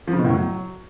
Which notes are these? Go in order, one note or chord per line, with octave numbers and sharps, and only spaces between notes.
F3
C#3
B2
A2
F#3